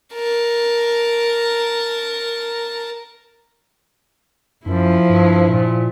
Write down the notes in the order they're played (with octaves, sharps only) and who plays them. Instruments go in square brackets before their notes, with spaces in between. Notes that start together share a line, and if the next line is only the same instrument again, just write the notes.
[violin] A#4 A5
[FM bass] F#2 [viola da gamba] F3 E4
[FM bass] G2
A#2